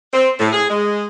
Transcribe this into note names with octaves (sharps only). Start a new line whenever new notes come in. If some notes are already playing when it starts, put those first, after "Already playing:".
C4
A2
G#4
G#3